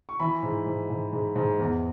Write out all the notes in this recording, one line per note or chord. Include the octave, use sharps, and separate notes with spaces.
C#6
E3 B5
G#2
G#2
G#2
G#2
G#2
E2